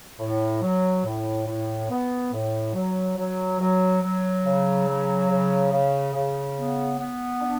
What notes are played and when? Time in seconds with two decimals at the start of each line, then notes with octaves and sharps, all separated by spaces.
0.19 A2
0.62 F#3
1.04 A2
1.47 A2
1.89 B3
2.32 A2
2.74 F#3
3.16 F#3
3.59 F#3
4.02 F#3
4.44 C#3
4.87 F#3
5.29 C#3
5.71 C#3
6.13 C#3
6.56 B3
6.98 B3
7.41 D4